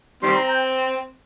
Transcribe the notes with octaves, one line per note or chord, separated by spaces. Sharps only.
D#3 G3 C4 C6
A#5
G5